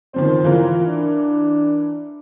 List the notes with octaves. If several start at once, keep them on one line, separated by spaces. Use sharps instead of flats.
D#3 F3 C4 C5
E3 F4 A#4
D4